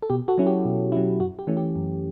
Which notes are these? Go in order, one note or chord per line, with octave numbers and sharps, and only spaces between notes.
A4
B2 G4
F#4 A4
F#3 C#4 E4
G4
B2
F#3 C#4 E4
F#2 F#4
G4
E3 A3 C#4
G4
F#2